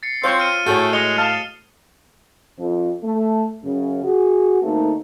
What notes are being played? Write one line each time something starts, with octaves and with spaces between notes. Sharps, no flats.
A6 C7 C#7
C4 F4 C5 C#5 C#6
F6 C#7 D#7
A2 A3 F#4 G#4 C#5 G5 A6
G#3 D#5 C#7 F7 G7
F5 A5 D#6 F6
F2
A3
F#2 C#3
F#4 G#4
D2 A3 A#3 C4 D#4 A4